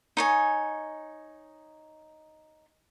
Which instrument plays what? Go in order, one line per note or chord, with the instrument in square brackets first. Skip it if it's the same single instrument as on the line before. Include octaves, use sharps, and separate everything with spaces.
[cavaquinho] D#4 C#5 G#5